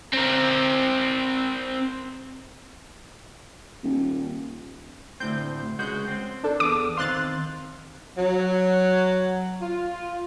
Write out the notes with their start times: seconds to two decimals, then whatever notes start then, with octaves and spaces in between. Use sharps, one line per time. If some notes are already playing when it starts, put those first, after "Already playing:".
0.14 C4 A#4
3.83 D#1
5.20 D2 A2 C4 G6
5.79 C#2 G#3 F#4 G6
6.08 C4
6.43 D4 A4
6.60 E2 D6
6.97 D#3 C4 F5 C6 F#6 A6
8.17 F#3
9.61 F4